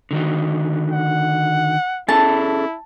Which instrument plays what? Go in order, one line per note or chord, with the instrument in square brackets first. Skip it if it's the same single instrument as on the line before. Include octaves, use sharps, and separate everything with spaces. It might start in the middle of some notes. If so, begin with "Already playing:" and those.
[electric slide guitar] D3 D#3 F#4
[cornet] F#5
[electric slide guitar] C#4 G#4 A4 [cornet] E4 [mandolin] A5